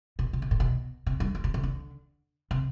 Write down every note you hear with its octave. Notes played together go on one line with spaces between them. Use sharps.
B2
C3
B2
A2
B2
C3
G2
F2
B2
C3
D3
C3